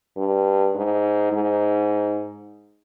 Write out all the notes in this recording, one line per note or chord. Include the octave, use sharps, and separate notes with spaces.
G2
G#2
G#2